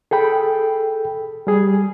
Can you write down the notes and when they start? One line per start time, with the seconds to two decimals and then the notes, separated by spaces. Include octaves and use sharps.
0.11 G#4 A4 G5 B5
1.47 G3 G#4